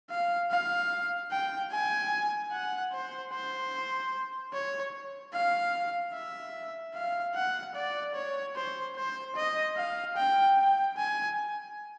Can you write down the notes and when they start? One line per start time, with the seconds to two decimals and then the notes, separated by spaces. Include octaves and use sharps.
0.10 F5
0.51 F5
1.31 G5
1.72 G#5
2.52 F#5
2.92 C5
3.33 C5
4.53 C#5
5.33 F5
6.14 E5
6.94 F5
7.35 F#5
7.75 D5
8.15 C#5
8.56 C5
8.96 C5
9.36 D#5
9.77 F5
10.16 G5
10.57 G5
10.97 G#5